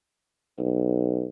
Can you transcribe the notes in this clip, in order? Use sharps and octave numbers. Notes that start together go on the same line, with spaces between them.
B1